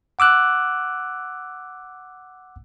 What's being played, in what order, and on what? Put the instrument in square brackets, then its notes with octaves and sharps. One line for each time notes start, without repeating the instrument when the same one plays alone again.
[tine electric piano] F#5 D6 E6 F#6